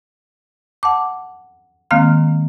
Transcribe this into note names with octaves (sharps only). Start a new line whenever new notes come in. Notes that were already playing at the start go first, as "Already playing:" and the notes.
F#5 A5 D6
D#3 G#3 A#3 C4 F5 F6